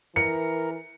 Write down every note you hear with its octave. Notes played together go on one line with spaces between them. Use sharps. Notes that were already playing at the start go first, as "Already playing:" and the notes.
E3 A#4 C#7